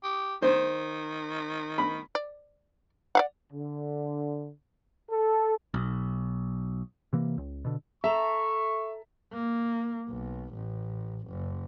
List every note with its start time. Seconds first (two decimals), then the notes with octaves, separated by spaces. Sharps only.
0.04 G4
0.42 D#3 C5
1.78 B5
2.15 D5
3.15 D5 F5 F#5
3.52 D3
5.11 A4
5.74 B1
7.13 C3 E3 A#3
7.38 C#2
7.65 B2 D3
8.04 A4 E5 A#5 C#6
9.33 A#3
10.08 B1
10.54 A1
11.28 F#1